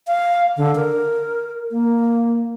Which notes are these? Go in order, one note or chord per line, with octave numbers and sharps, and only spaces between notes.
F5
D3
A#4
A#3